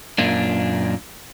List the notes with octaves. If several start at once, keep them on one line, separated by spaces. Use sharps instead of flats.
F#2 A#2 A#3 D4